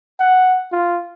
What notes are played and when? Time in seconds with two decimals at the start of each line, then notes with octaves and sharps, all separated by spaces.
0.19 F#5
0.72 F4